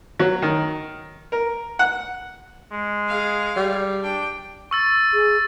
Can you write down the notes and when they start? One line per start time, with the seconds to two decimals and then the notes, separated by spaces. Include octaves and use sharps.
0.19 F#3
0.42 D#3
1.32 A#4
1.79 F#5
2.72 G#3
3.08 G#4 F5
3.56 G3
4.03 D4 G5
4.71 C#6 E6 A6
5.14 G#4